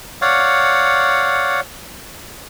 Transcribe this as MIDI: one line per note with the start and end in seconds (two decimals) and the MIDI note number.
0.22 1.61 73
0.22 1.61 74
0.22 1.61 77
0.22 1.61 78